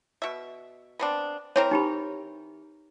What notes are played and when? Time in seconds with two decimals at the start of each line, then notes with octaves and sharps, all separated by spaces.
0.22 B2 E5
0.99 B3 C4 D4
1.56 E3 C4 A#4 C#5
1.71 D#4 G4 B5